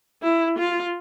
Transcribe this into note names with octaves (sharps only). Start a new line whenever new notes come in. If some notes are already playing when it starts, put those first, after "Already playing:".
E4
F4